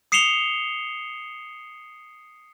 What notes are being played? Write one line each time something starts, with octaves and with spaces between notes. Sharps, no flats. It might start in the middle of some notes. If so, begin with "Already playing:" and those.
D#6 C7 C#7 E7 F7 G7